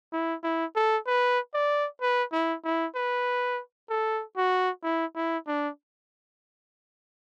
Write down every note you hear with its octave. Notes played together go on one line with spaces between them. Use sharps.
E4
E4
A4
B4
D5
B4
E4
E4
B4
A4
F#4
E4
E4
D4